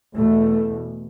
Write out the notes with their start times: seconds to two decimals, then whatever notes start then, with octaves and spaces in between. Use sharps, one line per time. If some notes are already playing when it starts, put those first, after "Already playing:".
0.17 E2 B2 A3